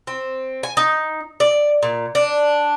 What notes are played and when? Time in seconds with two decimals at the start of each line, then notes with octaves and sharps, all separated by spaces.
0.07 C4
0.63 G#5
0.77 D#4
1.40 D5
1.83 A#2
2.15 D4